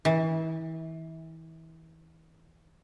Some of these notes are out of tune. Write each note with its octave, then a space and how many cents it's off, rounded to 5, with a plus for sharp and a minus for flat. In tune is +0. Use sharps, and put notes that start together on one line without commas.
E3 -30